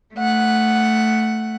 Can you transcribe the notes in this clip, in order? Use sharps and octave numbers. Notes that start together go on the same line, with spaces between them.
A3 F#5